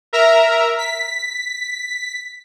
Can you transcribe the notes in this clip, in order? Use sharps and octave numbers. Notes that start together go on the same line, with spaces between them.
A#4 E5 A#5
B6